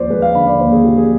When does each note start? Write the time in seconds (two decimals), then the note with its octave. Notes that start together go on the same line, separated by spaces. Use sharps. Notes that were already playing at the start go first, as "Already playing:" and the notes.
Already playing: D#2 F3 C5 D5
0.10 G#3 B4
0.22 F5
0.35 D3 B5
0.47 D5
0.59 D#2 C5
0.72 G#4
0.84 F3 G4
0.97 G#4